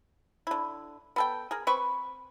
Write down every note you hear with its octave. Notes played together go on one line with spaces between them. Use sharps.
D3 E4
B3 A4 G5
G#4 A#4
C4 B4 B5 C#6